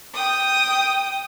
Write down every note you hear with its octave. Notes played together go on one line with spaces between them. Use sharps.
G5 D#6